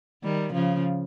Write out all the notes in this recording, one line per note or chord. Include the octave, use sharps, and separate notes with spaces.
D#3 G3
C#3 F3